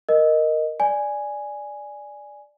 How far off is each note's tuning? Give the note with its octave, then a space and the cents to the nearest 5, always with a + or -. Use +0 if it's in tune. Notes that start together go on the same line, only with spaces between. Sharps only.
A#4 +0 D#5 +0
D5 +0 G#5 +0